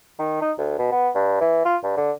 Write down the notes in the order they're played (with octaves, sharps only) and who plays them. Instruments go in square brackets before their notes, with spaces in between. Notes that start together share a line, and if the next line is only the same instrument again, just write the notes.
[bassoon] D#3
D#4
D2
B2
B3
G2
E3
F4
G2
D3